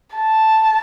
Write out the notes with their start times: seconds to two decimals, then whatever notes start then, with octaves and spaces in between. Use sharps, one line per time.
0.16 A5